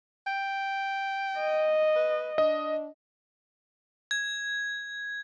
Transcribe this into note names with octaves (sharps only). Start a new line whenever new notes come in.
G5
D#5
B4
D4 D#5
G#6